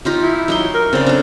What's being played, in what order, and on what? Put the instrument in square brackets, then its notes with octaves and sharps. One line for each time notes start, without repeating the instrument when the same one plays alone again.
[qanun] D#4 F4 G4
[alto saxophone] E4
[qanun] F#3 D#4 C6
[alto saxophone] A#4
[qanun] C#3 D5 [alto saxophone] C4
[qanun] D4 A4